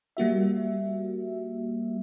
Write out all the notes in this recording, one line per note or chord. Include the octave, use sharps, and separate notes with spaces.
G3 A#3 F#4 E5